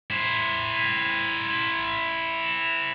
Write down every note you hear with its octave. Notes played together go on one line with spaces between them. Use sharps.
E4 C5